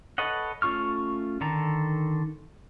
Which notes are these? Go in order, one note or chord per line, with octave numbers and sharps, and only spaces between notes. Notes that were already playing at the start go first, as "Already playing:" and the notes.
A4 B4 C#5 D#5 F#5
A3 C#4 F4 C#6 F6
D3 D#3 A4 A#5